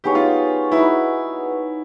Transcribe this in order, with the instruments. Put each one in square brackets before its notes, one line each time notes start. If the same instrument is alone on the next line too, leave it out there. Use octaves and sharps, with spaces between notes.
[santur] B3 D#4 G#4 C#5 [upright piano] G4
[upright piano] F4
[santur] D#4 F#4 B4 [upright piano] E4